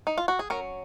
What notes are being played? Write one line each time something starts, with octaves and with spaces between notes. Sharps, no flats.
D#4
F4
F#4
G#4
F#3 C#4 A#4